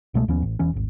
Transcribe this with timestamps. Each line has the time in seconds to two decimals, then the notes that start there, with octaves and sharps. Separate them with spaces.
0.14 C2 B2 G#3 A3
0.28 D#2 F3 B3 C#4
0.43 A1
0.59 E1 E3 C#4
0.74 D#1 G#1